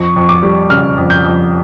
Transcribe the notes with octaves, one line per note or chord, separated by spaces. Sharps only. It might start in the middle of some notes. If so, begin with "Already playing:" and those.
Already playing: F2 C#6
F2
D6
G3
C#3 F6
F2
G6
F2